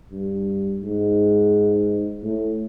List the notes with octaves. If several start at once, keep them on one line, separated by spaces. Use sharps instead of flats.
G2
G#2
A2